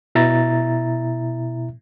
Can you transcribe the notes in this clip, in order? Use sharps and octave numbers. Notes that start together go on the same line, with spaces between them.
B2 E4 E5 A#5 A6